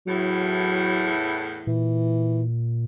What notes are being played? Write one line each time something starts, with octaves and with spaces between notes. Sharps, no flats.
E2 A2 F#3
A#2 E3